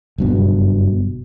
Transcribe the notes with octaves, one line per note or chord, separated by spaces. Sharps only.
F#1 G2 B2